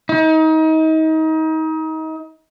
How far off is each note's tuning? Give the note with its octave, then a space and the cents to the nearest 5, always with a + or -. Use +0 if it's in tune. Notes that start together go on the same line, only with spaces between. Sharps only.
D#4 +30